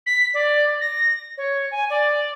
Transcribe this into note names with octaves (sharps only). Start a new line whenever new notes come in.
B6
D5
A#6
C#5
G#5
D5